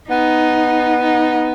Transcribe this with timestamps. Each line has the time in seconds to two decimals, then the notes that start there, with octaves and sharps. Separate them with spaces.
0.09 B3 D#4
1.03 D#4